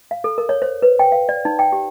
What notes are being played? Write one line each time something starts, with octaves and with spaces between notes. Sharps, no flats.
F5
A4
A#4
C#5
C5
B4
G5
F5
D5
D#4
G5
G4